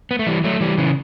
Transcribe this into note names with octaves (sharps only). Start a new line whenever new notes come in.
B3
A3
E3 G3
F#3 A3
E3 G3
C#3 E3